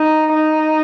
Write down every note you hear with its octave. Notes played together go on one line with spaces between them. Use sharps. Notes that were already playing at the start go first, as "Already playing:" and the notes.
Already playing: D#4
D#4